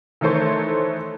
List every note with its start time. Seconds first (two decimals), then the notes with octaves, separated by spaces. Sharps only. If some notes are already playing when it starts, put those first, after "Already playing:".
0.21 D#3 E3 A3 A4 C5 C#5